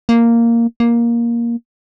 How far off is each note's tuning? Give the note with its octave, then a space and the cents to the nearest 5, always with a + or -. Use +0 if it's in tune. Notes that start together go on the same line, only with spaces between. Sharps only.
A#3 -5
A#3 +10